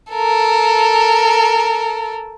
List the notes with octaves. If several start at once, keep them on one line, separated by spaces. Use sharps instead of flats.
A4 A#4